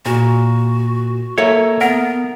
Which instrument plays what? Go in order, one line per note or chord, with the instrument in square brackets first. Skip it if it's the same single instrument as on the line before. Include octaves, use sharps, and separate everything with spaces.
[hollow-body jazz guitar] A#2 [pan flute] F#4
[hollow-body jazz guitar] A#3 A4 E5 [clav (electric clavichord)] C#5
[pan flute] B3 [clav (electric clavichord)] A#4 [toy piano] F#5